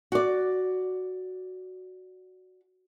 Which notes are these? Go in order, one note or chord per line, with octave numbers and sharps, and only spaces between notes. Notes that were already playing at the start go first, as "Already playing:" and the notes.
F#4 D5